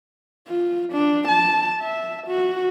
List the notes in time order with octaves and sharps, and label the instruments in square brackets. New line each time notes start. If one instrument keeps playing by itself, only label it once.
[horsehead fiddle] F4
D4
A5
E5
F#4